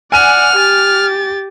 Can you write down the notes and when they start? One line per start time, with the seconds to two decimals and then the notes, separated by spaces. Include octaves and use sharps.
0.12 D5 F#5 G#5 F6 D#7
0.56 G4 A6